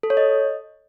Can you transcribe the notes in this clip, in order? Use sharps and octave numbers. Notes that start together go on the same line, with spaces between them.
A4
C#5
D#5